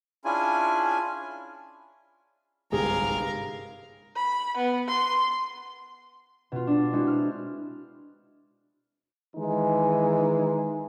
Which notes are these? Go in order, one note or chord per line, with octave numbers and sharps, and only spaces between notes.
C#4 D4 E4 F4 G#4 G#5
G1 C2 G#2 G4 G#4 A#4 F5
B5
B3
C6
B2 F4
D4
G#3 C4 E4 F#4
F6
D#3 E3 G#3 D#4